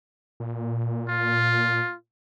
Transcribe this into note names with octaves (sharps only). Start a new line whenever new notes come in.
A#2
F4